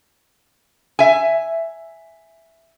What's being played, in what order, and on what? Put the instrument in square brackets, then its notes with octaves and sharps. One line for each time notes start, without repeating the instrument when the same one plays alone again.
[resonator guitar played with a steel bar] E5 G#5